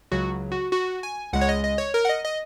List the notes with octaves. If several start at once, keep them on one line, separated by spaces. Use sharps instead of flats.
C#2 C#3 F#3 F#4
F#4
F#4
G#5
C#2 C#3 G#3 F#5
C#5
D#5
D#5
C#5
A#4
F#5
D#5
D#5